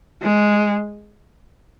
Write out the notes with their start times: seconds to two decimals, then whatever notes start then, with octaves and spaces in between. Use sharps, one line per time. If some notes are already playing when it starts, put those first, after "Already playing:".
0.23 G#3